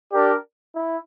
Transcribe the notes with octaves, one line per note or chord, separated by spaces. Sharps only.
D4 G4 A#4 D5
E4